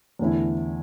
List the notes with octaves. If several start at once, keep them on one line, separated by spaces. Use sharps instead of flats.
E2 D3 A3 C#4 E4